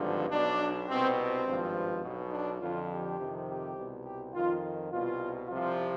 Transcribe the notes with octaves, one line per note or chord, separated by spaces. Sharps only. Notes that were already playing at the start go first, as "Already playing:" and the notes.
Already playing: G#1 G2 D3 F3
B1 B2 D4
C2 B2 C4
C4
G#1 G2 F3
B1 B2
D4
F2 D3 F3 F4
G4
F2 C3 D#3
G4
C2 B2
G4
F2 D#3 F4
C2 B2 F4
C2 C3 F3 F4